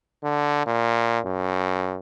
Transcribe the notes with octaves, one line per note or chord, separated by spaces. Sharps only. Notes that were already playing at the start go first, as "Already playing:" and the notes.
D3
A#2
F#2